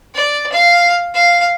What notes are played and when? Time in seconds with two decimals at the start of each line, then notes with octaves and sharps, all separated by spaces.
0.15 D5
0.52 F5
1.14 F5